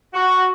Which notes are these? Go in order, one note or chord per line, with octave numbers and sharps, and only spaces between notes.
F#4